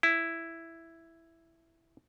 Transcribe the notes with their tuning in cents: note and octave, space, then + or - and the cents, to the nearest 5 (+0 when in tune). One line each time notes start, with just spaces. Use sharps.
E4 +5